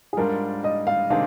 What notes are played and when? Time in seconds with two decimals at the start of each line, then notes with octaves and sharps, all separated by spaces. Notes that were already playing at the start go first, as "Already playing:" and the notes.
0.13 G#4
0.17 G#2 G3 D4 F4 A#4
0.64 D#5
0.87 F5
1.10 C3 D#3 G#3 D4 F5